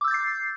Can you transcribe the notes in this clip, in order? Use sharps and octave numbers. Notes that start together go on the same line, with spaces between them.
D6 E6 G6 A6 C7